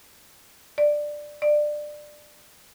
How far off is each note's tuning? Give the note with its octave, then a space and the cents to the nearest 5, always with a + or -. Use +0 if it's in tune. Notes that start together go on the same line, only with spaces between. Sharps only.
D5 +10
D5 +20